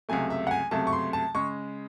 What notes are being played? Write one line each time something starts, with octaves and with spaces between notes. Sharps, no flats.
C#2 C3 F#3 A3 G#5
E5
F#5
G#5
C#2 C3 F#3 A3 A5
C#6
C6
A5
C#3 G#3 C#6